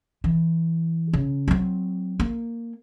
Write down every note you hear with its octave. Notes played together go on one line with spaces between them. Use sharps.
E3
C#3
F#3 C4
A#3